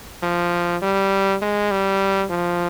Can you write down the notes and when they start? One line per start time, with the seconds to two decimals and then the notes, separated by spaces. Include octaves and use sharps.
0.23 F3
0.82 G3
1.42 G#3
1.71 G3
2.30 F3